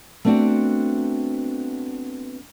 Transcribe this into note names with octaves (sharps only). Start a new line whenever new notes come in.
A3 B3 C4 D4 F#4